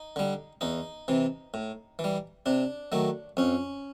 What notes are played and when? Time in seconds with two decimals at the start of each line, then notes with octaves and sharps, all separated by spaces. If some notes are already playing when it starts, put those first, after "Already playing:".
Already playing: D#4
0.16 D3 G3
0.61 E2 D#4
1.08 C3 E3
1.54 A2
1.99 E3
2.04 G3
2.46 C3 D4
2.92 D#3 F#3 A3
3.37 F2 C#4